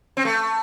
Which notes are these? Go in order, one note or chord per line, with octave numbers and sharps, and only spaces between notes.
C4
A3